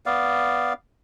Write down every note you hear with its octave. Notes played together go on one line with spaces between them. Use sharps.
B3 D5 F5